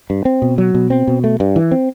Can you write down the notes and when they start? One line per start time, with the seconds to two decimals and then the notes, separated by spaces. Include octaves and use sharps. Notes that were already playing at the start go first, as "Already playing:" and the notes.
0.10 G2
0.25 C4
0.42 B2
0.58 F#3
0.74 B2
0.90 C4
1.07 B2
1.24 A3
1.40 G2
1.56 E3
1.71 C4